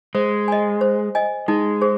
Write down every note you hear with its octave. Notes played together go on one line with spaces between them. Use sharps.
G#3 C5
D#5 G#5
C5
D#5 G#5
G#3 D#4
G#4 C5